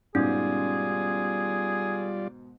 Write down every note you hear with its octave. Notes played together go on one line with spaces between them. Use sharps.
G#2 B2 D#3 G3 C#4 F4 G#4 D5